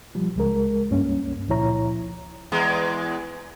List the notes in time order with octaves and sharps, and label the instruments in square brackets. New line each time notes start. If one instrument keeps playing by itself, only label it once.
[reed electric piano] B2 F3 G3
C#2 G#3 A#4
C2 G2 A#3 C#4
C#2 A#2 F3 E4 C#5 A#5
[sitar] E2 G#3